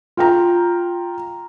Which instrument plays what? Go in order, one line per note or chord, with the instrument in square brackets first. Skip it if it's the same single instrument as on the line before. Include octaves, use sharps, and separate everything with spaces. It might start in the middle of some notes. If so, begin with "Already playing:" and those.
[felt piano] F4 G5 A#5